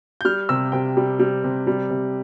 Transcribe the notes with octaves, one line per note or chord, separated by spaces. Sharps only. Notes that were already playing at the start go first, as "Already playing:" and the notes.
G6
G3 F6
C3 E6
C3 G5
G3
G3
C3
G3
C3